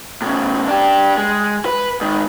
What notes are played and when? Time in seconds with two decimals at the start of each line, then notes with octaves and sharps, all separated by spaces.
0.22 A2 C#3
0.68 D4 G4
1.17 G#3
1.66 B4
2.01 G#2 D#3